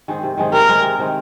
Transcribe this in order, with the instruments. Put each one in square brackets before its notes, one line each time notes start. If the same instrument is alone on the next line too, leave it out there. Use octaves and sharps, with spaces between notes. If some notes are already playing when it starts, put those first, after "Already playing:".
[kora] D#3 G#3 C4
C3
D#3 G#3 C4
[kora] C3 [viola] A#4
[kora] D#3 G#3 C4
C3
D#3 G#3 C4